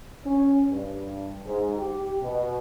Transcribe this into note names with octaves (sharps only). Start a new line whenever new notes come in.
C#4
G2
G#2
G4
B2